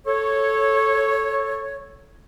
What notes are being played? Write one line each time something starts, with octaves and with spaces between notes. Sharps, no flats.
A4 C#5